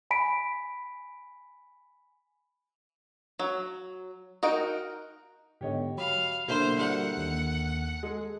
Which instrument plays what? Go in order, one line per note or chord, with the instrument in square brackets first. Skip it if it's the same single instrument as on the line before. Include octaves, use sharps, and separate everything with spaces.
[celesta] G#5 B5 B6 D7
[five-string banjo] F#3
D#4 F#4 A#4 G5
[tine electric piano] G#2 D3 B3 [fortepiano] G4 C#5 D#5
[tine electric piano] F#3 B5 [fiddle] F5
[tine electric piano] B2 [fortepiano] D3 A#3 E4 [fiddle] C5
[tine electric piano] G3 F#4 A#4 [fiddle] F#5
[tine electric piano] D#2
[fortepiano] G#3 [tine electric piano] G#4 A4